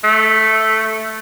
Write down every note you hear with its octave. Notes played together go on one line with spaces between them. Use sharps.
A3